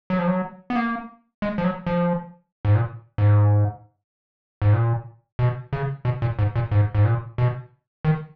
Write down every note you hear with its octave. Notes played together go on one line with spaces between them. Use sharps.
F#3
F3
F#3
B3
A#3
G#3
F3
F#3
F3
G#2
A#2
G#2
G#2
A#2
B2
C#3
B2
A#2
G#2
A#2
G#2
G#2
A#2
B2
D#3